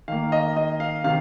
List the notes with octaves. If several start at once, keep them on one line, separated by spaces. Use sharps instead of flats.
D#3 A#3 F5
D#5
D#5
F5
C3 D#3 F5